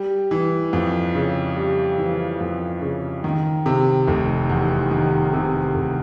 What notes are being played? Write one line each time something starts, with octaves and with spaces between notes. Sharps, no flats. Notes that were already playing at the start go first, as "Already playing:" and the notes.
Already playing: G3
E3
F2
C#3
G3
E3
F2
C#3
D#3
C3
F1
E2
D#3
C3
F1